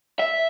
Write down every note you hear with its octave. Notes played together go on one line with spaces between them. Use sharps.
E5